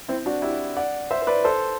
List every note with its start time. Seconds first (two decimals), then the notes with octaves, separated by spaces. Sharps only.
0.08 C4 E4
0.26 D4 F#4
0.42 E4 G4
0.77 D5 F#5
1.11 C5 E5
1.22 C5
1.27 B4 D5
1.44 A4 C5